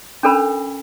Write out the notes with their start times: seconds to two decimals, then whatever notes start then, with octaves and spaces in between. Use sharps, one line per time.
0.23 C#4 D4 A4 A#4 B5